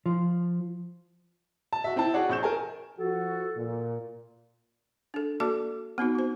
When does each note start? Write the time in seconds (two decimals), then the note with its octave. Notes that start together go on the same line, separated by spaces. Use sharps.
0.06 F3
1.73 A5
1.84 F#4 E5
1.96 C4 E4 G5 A5
2.14 F#4 G#4 C#5 D5 F#5
2.29 A#1 C#6 G6 E7
2.43 A#4 G#5 A5
2.99 F3 F#4 A4
3.57 A#2
5.14 D4 A4
5.40 A#3 F#4 A4 D5 A5 D6
5.98 B3 C4 D#4 F#4
6.15 F#4 C5